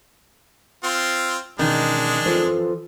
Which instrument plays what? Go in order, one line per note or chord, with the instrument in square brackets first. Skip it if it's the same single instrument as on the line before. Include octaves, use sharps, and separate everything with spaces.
[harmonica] C4 F4
[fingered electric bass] B2 E3 C#4 [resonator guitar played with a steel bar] D#3 [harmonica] G#3 D4
[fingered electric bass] E3 [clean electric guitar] F4 A4 C5